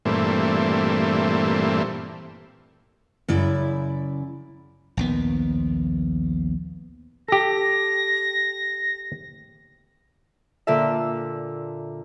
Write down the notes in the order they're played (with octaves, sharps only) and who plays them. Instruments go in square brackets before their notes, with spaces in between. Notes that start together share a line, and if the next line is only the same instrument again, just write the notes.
[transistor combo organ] G2 A#2 E3 A3 C4
[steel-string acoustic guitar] F#2 C#3 E4 D5
[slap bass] A#1 D#2 B3
[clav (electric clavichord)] G4 A4 [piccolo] A#6
[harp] A#2 D3 F4 A4 E5